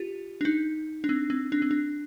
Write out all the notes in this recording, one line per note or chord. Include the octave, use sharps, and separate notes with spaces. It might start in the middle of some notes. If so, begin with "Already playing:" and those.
Already playing: F4 G4
D4
D#4
D4
C4
C4
D4
C4
D4